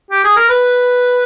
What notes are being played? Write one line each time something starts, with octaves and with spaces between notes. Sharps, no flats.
G4
G#4
A#4
B4